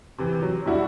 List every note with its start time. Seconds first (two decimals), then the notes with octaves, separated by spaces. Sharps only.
0.18 C3 E3
0.42 F#3
0.65 B2 G3 D4 E4 F#4